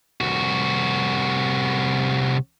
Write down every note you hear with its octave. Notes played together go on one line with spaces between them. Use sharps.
C2 F#4